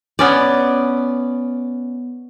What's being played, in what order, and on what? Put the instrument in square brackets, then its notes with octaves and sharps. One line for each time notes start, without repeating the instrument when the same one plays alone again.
[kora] B3 C#4 D5